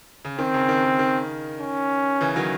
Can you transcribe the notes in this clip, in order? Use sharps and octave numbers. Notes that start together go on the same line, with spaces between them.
C#3
D#3 C4
C#3
D#3
D#3
D#3
C#4
C#3 E3
D#3 F#3